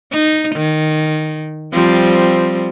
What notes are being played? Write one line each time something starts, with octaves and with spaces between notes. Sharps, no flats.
D#4
D#3
F3 G3 C4